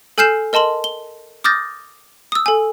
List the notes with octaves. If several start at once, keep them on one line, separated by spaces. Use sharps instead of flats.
A4 G#5 F6 G6 C7 E7
A#4 D#5 A5 C6 F#7
G7
D6 D#6 F6 G6 A6 A#6
D#6 E6
A4 G#5